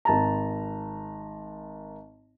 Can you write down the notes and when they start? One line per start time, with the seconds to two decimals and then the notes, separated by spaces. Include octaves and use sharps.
0.05 G#1 A5 A#5